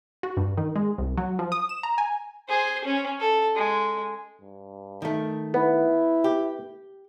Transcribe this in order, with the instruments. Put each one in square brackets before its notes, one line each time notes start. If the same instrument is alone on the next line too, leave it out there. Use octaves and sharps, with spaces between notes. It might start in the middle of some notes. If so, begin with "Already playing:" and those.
[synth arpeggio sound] F#4
G2
D#3
G#3
C2
F#3
F3
D#6
E7
A#5
G#5
[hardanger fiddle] G#4 C5
C#4
A4
G#3
[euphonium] G2
[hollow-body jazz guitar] D#3 A3
[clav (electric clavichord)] B3 [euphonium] E4
[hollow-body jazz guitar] G4